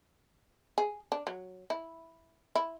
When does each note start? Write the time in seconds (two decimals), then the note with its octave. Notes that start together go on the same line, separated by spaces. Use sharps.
0.78 G#4
1.12 D4
1.27 F#3
1.70 E4
2.55 E4